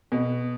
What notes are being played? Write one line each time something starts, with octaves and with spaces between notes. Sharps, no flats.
B2